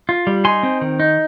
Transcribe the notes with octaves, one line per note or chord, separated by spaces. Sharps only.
F4
G3
D#4 G#5 C6
C4
D#3
D#4